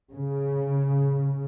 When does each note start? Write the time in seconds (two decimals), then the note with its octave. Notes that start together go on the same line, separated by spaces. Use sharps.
0.12 C#3